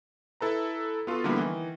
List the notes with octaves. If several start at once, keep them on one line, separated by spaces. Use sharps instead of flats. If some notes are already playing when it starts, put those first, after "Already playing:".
E4 A4 B4 A#5
B3 F4 F#4 A4
D3 F3 G3 A#3 B3 E4
D#3 E3